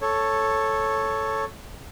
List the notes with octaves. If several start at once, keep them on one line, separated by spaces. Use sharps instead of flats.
A4 C#5